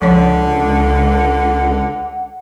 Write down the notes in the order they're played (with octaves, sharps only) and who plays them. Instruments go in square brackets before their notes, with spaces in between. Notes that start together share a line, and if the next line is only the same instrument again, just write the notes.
[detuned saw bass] C#2 [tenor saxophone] D3 [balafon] F3 C#5 [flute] F#5